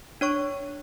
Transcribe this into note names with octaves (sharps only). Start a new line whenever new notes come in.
D4 C#5 C#6